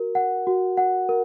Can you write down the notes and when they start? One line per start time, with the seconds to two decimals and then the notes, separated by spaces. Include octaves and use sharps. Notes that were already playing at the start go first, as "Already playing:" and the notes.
Already playing: F#4 A#4
0.15 F#5
0.47 F#4
0.77 F#5
1.09 A#4